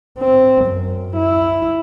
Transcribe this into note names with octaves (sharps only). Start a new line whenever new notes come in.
C4
F#2
E4